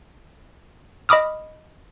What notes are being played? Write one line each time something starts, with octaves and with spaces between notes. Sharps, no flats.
D#5 B5 D6 D#6 F6